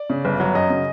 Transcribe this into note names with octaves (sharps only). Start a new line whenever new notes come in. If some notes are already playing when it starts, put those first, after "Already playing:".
Already playing: D5
C#3
G1
F#3
F#2 D#5
C#3